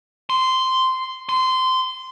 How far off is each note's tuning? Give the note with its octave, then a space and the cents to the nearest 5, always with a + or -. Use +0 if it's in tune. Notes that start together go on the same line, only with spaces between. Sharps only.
C6 -10
C6 -20